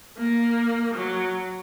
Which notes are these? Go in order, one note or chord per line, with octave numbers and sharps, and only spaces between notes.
A#3
F#3